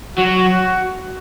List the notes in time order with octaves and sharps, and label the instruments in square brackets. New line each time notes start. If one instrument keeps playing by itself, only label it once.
[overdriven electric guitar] F#3 [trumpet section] F#4